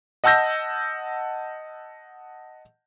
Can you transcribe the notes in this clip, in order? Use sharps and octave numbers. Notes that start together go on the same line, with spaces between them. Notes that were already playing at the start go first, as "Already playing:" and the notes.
D#5 F#5 A5 E6 G6 A#6